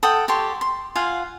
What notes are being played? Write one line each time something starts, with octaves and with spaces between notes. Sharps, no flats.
A4 F#5 G5 D#6
G4 A4 C#5 C6
C6
F4 F5 F#5 G#5